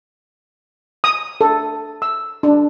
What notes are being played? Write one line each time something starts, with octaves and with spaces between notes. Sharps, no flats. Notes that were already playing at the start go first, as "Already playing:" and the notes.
D#6
A4
E6
D4